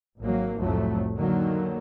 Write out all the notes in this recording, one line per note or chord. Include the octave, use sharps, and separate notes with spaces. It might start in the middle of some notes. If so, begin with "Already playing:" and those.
G#1 F#3 A#3
C2 F2 A2 F#3 A3
D3 D#3 F#3 A#3